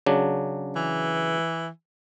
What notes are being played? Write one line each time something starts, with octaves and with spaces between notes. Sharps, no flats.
C#3 F#3 D4
E3